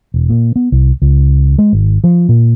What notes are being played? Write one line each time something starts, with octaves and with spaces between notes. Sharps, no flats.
E1
A#2
B3
C2
C#2
G#3
G#1
F3
A#2